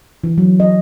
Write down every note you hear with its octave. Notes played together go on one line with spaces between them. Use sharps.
E3
F#3
D#5